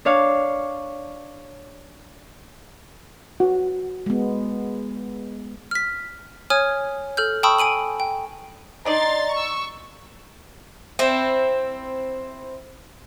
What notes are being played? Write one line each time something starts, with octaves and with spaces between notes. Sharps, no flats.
D4 C#5 F5
F#4
G#3 B3
F6 B6
C#5 G#5 D#6 F6 G#6
A4 F6 G6
G5 A5 B5 C#6 D#6 E6
G#5 D7 D#7 F#7
G5
D4 D#4 D5 A#5 C6 A6
C#6 E6
C4 E4